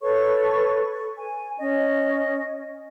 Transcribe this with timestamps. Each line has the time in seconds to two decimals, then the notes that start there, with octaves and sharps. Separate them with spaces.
0.01 A4 B4 C#5 C#6
1.16 G#5
1.58 C#4 D#5